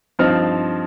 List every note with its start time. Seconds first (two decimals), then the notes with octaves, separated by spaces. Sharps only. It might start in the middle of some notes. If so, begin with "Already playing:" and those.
0.19 G2 F3 C4 D#4 F6